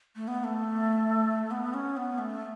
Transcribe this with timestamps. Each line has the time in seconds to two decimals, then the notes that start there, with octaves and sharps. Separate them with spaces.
0.16 A3
0.28 B3
0.40 B3
0.44 A3
1.51 B3
1.74 C#4
1.97 B3
2.18 A3